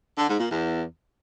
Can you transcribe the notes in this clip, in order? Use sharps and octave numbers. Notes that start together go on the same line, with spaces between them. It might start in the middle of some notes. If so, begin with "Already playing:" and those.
D3
G#2
A#2
E2